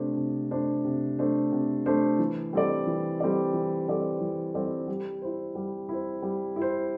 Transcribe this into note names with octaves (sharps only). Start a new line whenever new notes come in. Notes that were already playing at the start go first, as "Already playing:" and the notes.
Already playing: C3 A3 D4 C5
C3
A3 D4 C5
C3
A3 D4 C5
C3
A3 D4 C5
E3
G3 C4 A4 D5
E3
G3 C4 A4 D5
E3
G3 C4 A4 D5
E3
G3 C4 A4 D5
G3
E4 C5
G3
E4 C5
G3
E4
C5